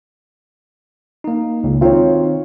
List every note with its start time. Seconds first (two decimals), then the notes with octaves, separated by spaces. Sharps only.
1.24 A#3 D#4
1.64 C#2
1.81 D#3 C4 D#4 F4 C#5